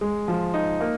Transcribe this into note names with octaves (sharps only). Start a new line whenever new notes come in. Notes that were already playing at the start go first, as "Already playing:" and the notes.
G#3
F3
D#4
A#3